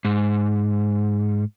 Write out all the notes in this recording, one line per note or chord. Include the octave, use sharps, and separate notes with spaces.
G#2